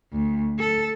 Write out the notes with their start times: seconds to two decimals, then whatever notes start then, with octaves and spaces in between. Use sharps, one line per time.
0.13 D2
0.59 A4